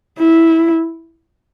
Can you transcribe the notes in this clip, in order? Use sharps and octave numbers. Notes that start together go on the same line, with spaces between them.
E4